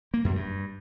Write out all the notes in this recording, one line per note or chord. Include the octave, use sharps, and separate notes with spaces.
A#3
F#2
G2